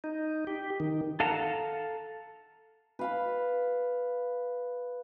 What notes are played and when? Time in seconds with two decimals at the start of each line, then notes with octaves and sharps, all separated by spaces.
0.04 D#4
0.47 G4
0.80 D#3
1.20 A4 F5 F#5 A5 A#5
2.99 B4 F5 B5